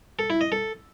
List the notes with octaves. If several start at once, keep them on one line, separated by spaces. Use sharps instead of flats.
A4
E4
D#5
A4